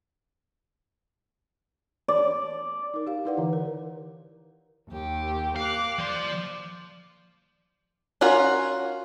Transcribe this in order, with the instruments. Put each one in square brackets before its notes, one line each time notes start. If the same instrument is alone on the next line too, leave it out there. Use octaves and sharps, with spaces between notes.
[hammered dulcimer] D5
[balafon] D#4 A#4
G4 F5
D#4 E4 B4 D5 F#5
D3 E3
A#4
[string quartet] D#2 G4
[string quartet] A#3 D6 F#6 [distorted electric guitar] F5
[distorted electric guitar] F3 C6 [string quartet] D5
[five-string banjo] C#4 F4 F#4 A#4